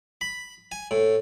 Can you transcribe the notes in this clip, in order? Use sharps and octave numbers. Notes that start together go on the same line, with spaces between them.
B5
G#5
A2